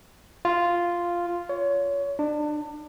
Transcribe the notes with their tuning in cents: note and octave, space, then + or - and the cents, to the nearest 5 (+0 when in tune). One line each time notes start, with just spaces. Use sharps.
F4 -5
C#5 +25
D4 +30